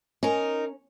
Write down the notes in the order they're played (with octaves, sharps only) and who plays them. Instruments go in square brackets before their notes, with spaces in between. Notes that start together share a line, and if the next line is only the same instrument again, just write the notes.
[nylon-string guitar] C#4 [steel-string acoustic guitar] D#4 A#4